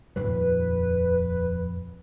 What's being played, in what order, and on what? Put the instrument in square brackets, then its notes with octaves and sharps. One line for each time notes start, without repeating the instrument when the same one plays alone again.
[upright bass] D#1 F2 [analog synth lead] B4